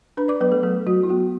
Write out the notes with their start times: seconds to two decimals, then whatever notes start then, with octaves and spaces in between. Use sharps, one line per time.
0.17 D4 B4 B5
0.28 D5 D6
0.40 F#3 B3 B4
0.52 A3 A4
0.63 F#3 A3 A4
0.87 F#3 F#4
1.03 E4
1.09 B3 F#4